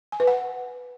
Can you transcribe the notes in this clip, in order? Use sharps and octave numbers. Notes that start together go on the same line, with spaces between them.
G#5
B4
F#5